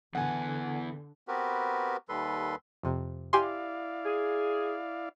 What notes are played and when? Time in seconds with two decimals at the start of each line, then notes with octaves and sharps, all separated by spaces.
0.15 E2 D3 B3 F#5 G#5
1.28 B3 C4 F#4 G4 A#4 B4
2.09 D#2 D#3 G3 A4 B4 C6
2.83 F2 C3
3.33 E4 G4 D5 F5 G#5 C6
4.05 G#4